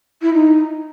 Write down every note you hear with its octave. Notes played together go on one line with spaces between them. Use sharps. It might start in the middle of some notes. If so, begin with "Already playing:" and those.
E4
D#4